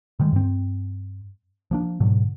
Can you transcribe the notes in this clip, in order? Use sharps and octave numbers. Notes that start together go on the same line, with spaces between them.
D3 D#3 G3 G#3
G2 C4
F3 A#3 D4
G#2 B2 D3 F#3